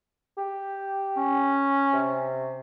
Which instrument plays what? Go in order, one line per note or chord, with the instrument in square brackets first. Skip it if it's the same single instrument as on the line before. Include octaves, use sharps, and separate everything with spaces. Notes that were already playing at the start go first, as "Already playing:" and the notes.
[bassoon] G4
[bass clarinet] C#4
[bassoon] C3